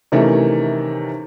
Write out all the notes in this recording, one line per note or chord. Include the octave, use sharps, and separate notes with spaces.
C3 D#3 E3 A3 C#4